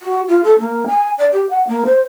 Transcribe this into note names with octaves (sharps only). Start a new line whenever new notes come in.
F#4
F4
A4
A#3
G#5
D5
G4
F#5
A#3
C5